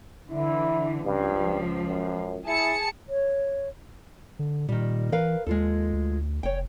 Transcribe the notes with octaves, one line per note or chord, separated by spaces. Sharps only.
D3 E3 E4
C#2 G2 F3
F#2
E4 G#4 A5 C#7
C#5
D3
A#2 D#3 G3
E3 A#4 B4 F5
D#2 G#3 F4 A4
D2
F1 C#5 G5